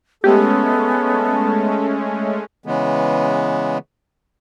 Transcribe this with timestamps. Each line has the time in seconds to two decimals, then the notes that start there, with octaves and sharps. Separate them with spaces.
0.24 G#3 A3 B3 C#4 G4 A4
2.66 C#3 E3 G#3 B3